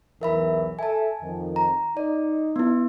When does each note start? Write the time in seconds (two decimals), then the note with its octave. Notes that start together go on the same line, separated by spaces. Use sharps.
0.21 B1 E2 E3 A#4 E5 B5
0.79 A4 E5 G#5 A5
1.22 F2 D#3
1.56 A#5
1.97 D#4 D5
2.56 B3 E4